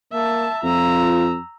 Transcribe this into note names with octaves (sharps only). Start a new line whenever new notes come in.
A#3 E5 A5
F2 F4 A#5 E6